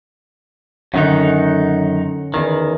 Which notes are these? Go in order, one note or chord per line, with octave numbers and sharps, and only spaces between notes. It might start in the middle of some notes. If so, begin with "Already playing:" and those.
F#2 D3 D#3 C#4 D#4 F#5
E2 D#3